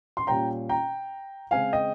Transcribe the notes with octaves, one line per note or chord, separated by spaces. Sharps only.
C6
A#2 G3 C#4 G5 A#5
G5 A#5
C#3 G#3 C4 F5 G#5
D#5 G5